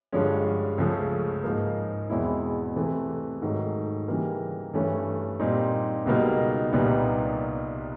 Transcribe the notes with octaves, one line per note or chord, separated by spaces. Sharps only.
G2 D3 F3 G#3 C#4
C#2 C#3 F3 A3 C#4
G#2 F3 A#3
E2 B2 G#3 C4 E4
C3 E3 A3 C4
G#2 D#3 F#3 A3
C#3 E3 G3 A#3
G2 E3 A3 C#4
A#2 G3 C4 D#4
C#2 B2 G3 A#3 D#4
C2 A#2 G3 B3 D#4